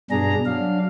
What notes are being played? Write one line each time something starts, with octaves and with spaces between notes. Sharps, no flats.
G2 B2 D4 G#4 A#5
F#3 D4 F5